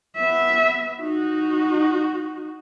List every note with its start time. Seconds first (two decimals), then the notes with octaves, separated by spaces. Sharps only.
0.16 B3 E5
1.01 D#4 F#4